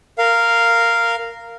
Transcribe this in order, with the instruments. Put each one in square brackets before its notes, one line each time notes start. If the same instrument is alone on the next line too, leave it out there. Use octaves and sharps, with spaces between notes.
[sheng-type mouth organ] A#4 F5